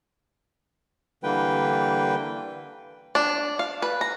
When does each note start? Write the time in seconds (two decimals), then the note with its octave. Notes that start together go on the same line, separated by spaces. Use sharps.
1.23 D3 E3 G3 A#3 B4 G5
3.15 D4
3.59 F5
3.82 B4
4.01 A#5